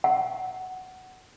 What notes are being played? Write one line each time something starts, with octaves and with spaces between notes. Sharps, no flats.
F#5